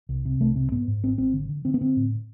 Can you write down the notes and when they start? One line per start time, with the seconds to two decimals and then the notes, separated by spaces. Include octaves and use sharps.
0.09 C2
0.25 C3
0.41 C2 A3
0.56 C3
0.71 G#2 B3
0.88 G#2
1.03 G#1 C4
1.18 G#1 C4
1.34 D3
1.49 D3
1.65 D3 C4
1.74 B3
1.81 D3 C4
1.96 A2